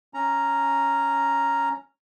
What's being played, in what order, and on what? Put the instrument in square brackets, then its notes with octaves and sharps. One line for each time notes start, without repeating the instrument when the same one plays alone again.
[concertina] C#4 A#5